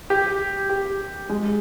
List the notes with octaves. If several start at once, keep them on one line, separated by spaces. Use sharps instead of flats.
G4
G4
G#3